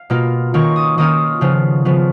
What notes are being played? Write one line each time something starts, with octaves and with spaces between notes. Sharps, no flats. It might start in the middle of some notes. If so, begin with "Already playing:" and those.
Already playing: F5
B2 A#3 F4
D#3 A#3 C#4 F4 C#6
D#6
D#3 A#3 C#4 F4 D#6
C#3 F3 B3 F4
C#3 F3 B3 F4